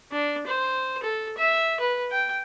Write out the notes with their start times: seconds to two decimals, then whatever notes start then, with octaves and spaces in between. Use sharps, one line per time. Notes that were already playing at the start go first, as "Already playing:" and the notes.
0.12 D4
0.47 C5
1.03 A4
1.38 E5
1.80 B4
2.11 G5